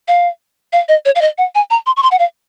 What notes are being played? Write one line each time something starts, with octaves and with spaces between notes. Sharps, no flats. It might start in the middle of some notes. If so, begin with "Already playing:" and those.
F5
F5
D#5
C#5
F5
D#5
F#5
G#5
A#5
C6
C#6
C6
F#5
F5